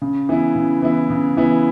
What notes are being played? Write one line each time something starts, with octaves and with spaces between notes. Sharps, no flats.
C#3
E3 B3 E4
C#3
E3 B3 E4
C#3
E3 B3 E4